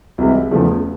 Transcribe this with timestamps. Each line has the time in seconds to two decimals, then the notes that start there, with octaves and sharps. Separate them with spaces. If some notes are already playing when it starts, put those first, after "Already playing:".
0.18 C2 C3 E3 G#3
0.51 E2 C#3 F3 A3